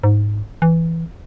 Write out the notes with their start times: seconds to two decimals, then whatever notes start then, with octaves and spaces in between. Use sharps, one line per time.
0.04 G#2
0.62 E3